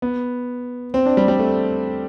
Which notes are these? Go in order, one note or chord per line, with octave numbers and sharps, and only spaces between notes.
B3
C4
D4
G3
G3
A3